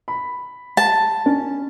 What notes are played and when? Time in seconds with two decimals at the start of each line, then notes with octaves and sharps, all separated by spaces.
0.08 B5
0.77 A5
1.26 C#4